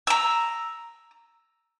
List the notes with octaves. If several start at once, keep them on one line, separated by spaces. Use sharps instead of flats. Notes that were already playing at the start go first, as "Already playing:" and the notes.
A#5 E6